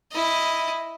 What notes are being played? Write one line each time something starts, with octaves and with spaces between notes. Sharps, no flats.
E4 D#5